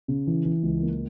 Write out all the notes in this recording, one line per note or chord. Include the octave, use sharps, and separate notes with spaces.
C#3
E3
E3
C#2
A#3